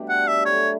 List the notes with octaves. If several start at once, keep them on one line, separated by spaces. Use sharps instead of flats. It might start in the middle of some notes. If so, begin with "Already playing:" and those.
Already playing: B2 G3 A3 D4 G4
F#5
E5
F#3 A3 E4 C#5